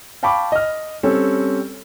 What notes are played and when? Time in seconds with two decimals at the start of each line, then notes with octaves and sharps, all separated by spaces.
0.23 F5 G5 A5 B5 C#6 D6
0.52 D#5 F6
1.03 G3 C4 C#4 A4